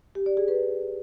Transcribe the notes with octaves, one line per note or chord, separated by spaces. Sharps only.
G4
D5
G#4
B4